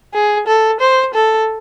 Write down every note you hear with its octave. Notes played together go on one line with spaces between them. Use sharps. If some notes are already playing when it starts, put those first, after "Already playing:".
G#4
A4
C5
A4